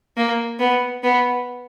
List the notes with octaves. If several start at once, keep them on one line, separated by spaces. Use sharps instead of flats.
A#3
B3
B3